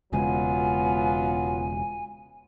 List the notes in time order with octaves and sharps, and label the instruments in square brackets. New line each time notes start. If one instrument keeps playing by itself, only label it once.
[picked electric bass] E1 C#3 G#3 [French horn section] F#3 B3 F4 [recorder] G#5